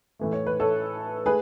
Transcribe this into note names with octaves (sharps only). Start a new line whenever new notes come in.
A2 E3 A3
C#5
B4
A4 C#5
A3 G#4 B4